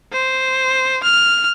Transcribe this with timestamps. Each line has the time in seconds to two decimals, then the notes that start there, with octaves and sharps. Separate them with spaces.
0.12 C5
1.03 F6